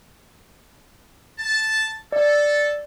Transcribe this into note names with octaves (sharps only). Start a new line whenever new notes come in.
A5
A4 D5